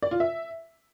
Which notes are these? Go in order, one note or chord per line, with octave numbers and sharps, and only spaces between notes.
D5
F4
E5